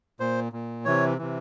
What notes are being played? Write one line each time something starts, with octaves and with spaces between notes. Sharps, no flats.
A#2 C5
A#2
C3 E3 C#5
C3 E3